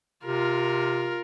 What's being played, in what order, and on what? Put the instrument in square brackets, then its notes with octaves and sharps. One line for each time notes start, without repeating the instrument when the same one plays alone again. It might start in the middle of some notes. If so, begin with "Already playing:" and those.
[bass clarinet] C3 [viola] F4 A#4